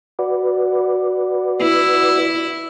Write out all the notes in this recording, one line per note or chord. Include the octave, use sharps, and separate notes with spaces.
F#4 B4 D5
E4